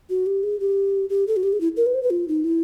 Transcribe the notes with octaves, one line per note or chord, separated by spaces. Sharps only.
F#4
G4
G#4
G4
G4
A4
F#4
G4
G#4
E4
A#4
B4
C5
B4
F4
D#4
E4